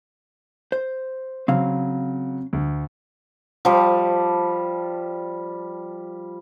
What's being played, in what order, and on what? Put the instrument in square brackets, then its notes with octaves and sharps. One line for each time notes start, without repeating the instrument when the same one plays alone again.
[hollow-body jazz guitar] C5
[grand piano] C#3 F#3 [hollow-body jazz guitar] C4 F5
[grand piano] D2
[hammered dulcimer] F3 G3